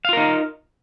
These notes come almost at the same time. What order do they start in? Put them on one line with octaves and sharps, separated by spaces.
F5 F4 A#4 D#4